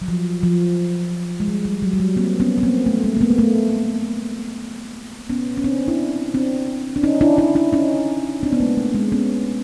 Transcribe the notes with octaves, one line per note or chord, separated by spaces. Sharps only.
F#3
F3
F3
G#3
G3
G3
F#3
G3
F#3
A#3 C4
B3 C#4
B3
A#3 C4
A3
G#3 A#3
A#3
A3 B3
A#3
A3 B3
B3 C#4
C#4
C4 D4
D4 E4
C4 D4
D4
C#4 D#4
D4 E4
D4 E4
D4 E4
C#4 D#4
C4 D4
B3
G#3 A#3
A3
G#3
B3 C#4